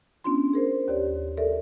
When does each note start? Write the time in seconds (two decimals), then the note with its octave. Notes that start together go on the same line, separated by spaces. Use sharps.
0.24 B3 C#4 D4 F4 C6
0.53 G#4 A#4 C5
0.88 D#2 G4 C#5 D5
1.37 A4 A#4 D5 E5